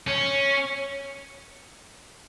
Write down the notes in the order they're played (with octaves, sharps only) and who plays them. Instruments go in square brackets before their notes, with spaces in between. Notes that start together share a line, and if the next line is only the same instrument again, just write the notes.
[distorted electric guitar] C#4